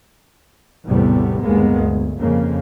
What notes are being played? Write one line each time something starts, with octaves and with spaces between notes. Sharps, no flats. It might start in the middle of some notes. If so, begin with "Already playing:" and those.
A1 E2 C3 G3 A3 B3
G1 D#2 G#3 A#3 B3
D2
F2 C#3 A#3